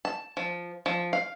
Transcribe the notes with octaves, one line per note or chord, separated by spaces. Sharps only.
A5
F3
F3
F5